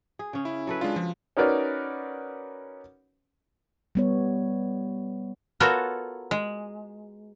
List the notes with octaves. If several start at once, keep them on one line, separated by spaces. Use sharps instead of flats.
G#4
C#3 C#4
E4
F#3 A4 B4
G#3 D4 F4
F3
C#4 D#4 F#4 A#4 B4 D5
G3 B3 C#5
B3 F4 F#4 A4 A#4 C#5
G#3